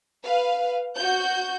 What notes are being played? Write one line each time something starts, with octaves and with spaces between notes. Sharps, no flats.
B4 F5
F#4 G6